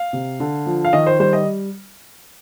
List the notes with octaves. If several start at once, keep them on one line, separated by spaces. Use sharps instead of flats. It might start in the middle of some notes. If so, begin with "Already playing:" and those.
Already playing: F5
C3
D3
F3
F5
D#3 D#5
C5
G3 C5
D#5